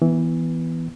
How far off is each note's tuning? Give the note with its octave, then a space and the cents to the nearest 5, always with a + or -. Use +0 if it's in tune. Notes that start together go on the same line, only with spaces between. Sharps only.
E3 -5 B3 +0